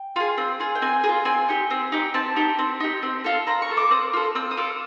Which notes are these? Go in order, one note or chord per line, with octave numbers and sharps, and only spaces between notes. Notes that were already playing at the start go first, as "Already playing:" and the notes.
Already playing: G5
F4 G#4
C4
F4 G#4
G5
C4 G#5
G#4
F4
C4 G#5
D#4 G4
C4
D#4 G4
C4 A5
D#4 G4
C4
D#4 G4
C4
F4 A4
C4 A#5
C#6
F4 A4
D6
C4 D#6
F4 A4
C4 E6
D#6
F4 A4 D6